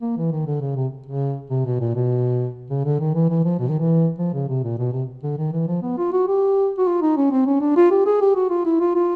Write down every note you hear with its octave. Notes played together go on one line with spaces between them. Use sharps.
A#3
E3
D#3
D3
C#3
C3
C#3
C3
B2
A#2
B2
C#3
D3
D#3
E3
E3
F3
B2
D#3
E3
F3
C#3
C3
A#2
B2
C3
D3
D#3
E3
F3
B3
F4
F#4
G4
F#4
F4
D#4
C#4
C4
C#4
D4
F4
G4
G#4
G4
F#4
F4
E4
F4
F4